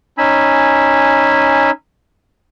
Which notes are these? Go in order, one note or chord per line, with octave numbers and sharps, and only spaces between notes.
C#4 D#4 G#5 B5 E6